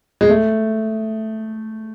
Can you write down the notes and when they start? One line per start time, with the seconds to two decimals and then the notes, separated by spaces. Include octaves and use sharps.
0.21 G#3
0.29 A3